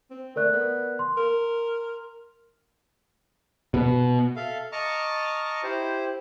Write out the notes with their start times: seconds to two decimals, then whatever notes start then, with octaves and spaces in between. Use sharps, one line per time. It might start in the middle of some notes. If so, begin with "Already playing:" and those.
0.11 C4
0.36 A3 A#4 D5 F#6
0.53 B3
0.99 C6
1.17 A#4
3.74 B2
4.36 A4 E5 F5
4.72 D#5 A5 A#5 C#6 D6 F6
5.63 E4 G4 C5